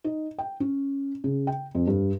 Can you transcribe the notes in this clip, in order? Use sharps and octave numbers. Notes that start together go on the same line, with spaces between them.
D#4
G5
C#4
C#3
G5
F2
G2